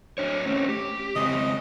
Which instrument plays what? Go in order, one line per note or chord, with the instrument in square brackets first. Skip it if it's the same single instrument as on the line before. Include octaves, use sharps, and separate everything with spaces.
[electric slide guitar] F#3 D4 C#5
A3 C4 C#4
G4
[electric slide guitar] C#3 G#3 C4 [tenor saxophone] D#5